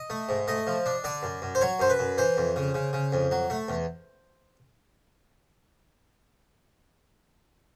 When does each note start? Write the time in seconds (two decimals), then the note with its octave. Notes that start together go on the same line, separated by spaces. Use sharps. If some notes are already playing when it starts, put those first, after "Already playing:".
Already playing: D#5
0.10 A3
0.29 G#2
0.48 A3 D#5
0.67 F3
0.86 D4
1.04 D3 D5
1.23 F#2
1.42 F#2
1.55 C5
1.61 F#3 C#5
1.79 F#2 C5
1.90 B4
1.99 F#2
2.18 E3 C5
2.37 F2
2.56 C#3
2.74 C#3
2.93 C#3
3.12 F2
3.31 F#3
3.50 A3
3.68 E2